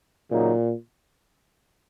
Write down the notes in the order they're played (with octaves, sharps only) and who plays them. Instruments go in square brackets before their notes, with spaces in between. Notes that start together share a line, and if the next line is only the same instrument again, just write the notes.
[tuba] A#2 [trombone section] C#3 F#3 A#3 D#4